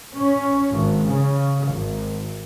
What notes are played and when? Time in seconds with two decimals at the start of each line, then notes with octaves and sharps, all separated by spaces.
0.14 C#4
0.71 G#1
1.09 C#3
1.68 G#1